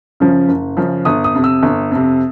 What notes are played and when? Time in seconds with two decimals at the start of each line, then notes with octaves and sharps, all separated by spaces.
0.20 F#2 C#3 F3
0.48 F#1
0.77 F#2 C#3 F3
1.05 G1 D#6
1.24 D#6
1.34 F2 C3
1.44 E6
1.63 G1
1.91 F2 C3